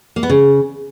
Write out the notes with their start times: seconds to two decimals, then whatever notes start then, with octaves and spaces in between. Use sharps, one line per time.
0.16 A#3
0.23 B3
0.30 C#3